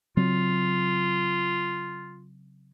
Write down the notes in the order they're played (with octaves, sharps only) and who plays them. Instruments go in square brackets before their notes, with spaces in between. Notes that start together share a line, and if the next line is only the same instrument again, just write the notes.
[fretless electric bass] C#3 F#3 C4 [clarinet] F4